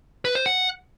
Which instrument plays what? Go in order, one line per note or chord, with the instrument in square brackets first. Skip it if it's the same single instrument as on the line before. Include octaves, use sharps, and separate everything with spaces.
[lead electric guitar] B4
C5
F#5